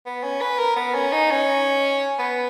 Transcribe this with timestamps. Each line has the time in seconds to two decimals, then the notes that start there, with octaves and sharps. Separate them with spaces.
0.06 B3
0.23 C#4
0.41 B4
0.58 A#4
0.76 B3
0.95 C#4
1.13 D#4
1.31 C#4
2.19 B3